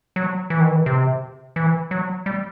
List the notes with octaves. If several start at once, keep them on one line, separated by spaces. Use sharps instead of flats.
F#3
E3
D#3
E3
C3
E3
F#3
G3